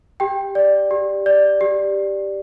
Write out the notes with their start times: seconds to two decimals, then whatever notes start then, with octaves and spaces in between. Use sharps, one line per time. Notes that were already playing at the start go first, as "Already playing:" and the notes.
0.20 G4 G5
0.55 D5
0.91 G4
1.26 D5
1.61 G4